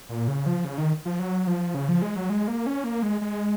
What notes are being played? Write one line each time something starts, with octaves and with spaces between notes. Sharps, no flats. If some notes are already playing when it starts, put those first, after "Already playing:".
A#2
C#3
F3
C#3
D#3
F3
F#3
F3
C#3
F3
G#3
F#3
G#3
A#3
C#4
A#3
G#3
G#3